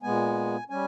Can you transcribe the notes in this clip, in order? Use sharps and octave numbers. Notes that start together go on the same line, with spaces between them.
A#2 G#3 B3 G#5
G3 C#4 G#5